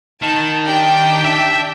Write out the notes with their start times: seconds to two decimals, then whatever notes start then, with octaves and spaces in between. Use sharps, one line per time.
0.22 D#3 A5
0.64 D4 G4 G5
1.25 E5